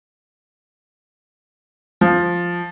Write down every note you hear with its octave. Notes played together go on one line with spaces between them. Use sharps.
F3